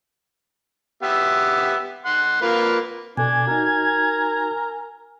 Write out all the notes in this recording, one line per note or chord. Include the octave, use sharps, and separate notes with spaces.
B3 G4 E5
F#5 C6
A#3 F4 B4
B2 D4 A4 G#5 G#6
D#4 F#4 A#4